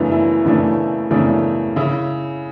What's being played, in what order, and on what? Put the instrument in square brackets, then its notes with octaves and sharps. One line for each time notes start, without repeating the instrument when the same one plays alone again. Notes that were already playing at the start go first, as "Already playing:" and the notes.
Already playing: [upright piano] F#2 C#3 E3 A3 D4 F#4
E4
F#2 C#3 E3 A3 D4
F#2 C#3 E3 A3 D4
C#3 E4